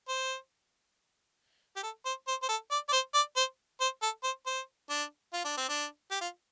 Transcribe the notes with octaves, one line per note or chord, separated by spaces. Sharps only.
C5
G4
A4
C5
C5
C5
A4
D5
D5
C5
D5
C5
C5
A4
C5
C5
D4
F4
D4
C4
D4
G4
F4